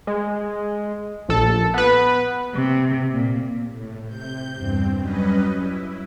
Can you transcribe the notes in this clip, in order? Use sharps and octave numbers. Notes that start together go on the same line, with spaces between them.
G#3
A#1 A4
B3 B4
C3
A#2
A2
C3 G6
E2 G2 C4
F#3 G3 C#4 B4 D#5
E4